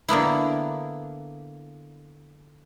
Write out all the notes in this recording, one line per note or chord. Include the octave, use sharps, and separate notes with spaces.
D3 A#3 B3 E4